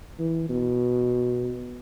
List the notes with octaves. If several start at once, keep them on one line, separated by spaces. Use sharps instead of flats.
E3
B2